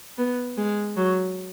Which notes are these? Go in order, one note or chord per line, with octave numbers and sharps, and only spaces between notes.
B3
G#3
F#3